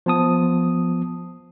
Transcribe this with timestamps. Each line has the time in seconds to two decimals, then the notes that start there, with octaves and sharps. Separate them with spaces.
0.06 F3 B3 A5 D#6